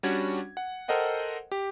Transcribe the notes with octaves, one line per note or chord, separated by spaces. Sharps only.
G3 C#4 D4 F#4 F#5 G#6
F#5
A4 A#4 C5 D#5 F#5 G5
G4